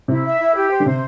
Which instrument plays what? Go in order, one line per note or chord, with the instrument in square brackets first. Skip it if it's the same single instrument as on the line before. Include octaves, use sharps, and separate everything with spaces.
[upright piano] C3 [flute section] E4
[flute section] E5
E4
G4
C5
[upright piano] D3
[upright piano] C3 [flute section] C5